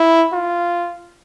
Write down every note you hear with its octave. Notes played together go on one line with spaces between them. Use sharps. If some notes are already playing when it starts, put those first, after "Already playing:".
Already playing: E4
F4